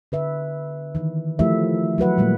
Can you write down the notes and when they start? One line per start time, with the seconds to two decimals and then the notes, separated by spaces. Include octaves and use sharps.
0.12 D3 B4 E5
0.95 D#3 E3
1.39 F3 A3 E4 G4 A#4 E5
1.98 F#3 F#4 B4 F#5
2.18 A#2 G3 G#3 A#3